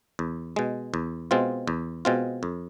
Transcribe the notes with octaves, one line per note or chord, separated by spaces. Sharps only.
E2
B2 G#3
E2
B2 G#3 C4 F4
E2
B2 G#3 C4 F4
F2